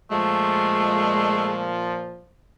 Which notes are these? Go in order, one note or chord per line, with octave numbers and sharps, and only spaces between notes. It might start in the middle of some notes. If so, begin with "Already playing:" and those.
A#2 F3 G#3 A3